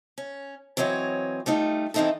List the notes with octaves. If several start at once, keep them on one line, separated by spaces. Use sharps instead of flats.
C#4
E3 F#3 C4 C#5 D#5
G3 A3 D#4 F4
D#3 E3 C4 D#4 E4 A4